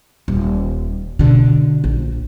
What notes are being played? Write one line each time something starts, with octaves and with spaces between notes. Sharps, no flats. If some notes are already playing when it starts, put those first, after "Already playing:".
D#1
B2 D3
A#1